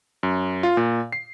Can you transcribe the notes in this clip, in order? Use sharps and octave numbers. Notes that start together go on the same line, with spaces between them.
F#2
F4
A#2
C7